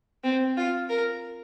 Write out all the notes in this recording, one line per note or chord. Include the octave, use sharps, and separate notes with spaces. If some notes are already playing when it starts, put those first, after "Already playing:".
C4
F4
A#4